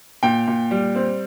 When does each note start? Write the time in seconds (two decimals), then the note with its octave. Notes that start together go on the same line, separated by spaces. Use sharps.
0.23 A#2 G5
0.47 A#2
0.71 G3
0.95 C4